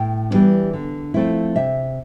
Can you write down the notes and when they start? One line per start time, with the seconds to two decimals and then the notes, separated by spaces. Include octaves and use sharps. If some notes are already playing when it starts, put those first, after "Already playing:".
Already playing: A2 G5
0.31 E3 G3 B3 D4
0.73 D3
1.14 F3 A3 C4 E4
1.56 C3 E5